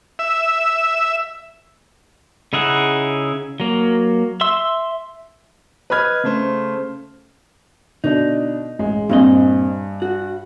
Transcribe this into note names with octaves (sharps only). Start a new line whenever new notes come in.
E5
C#3 D#4 E4 G#4 F#5
F#3 A#3
E5 C6 E6
B4 D#5 B5 F6 G#6
C#3 A3 C5
B2 D3 D4 D#4
A1 G#3
G2 A#2 C4 D#5 G#5
F#4